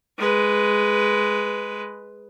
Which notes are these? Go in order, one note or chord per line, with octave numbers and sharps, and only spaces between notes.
G#3 B4